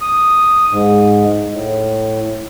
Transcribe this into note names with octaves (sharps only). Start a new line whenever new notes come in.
D#6
G#2
A2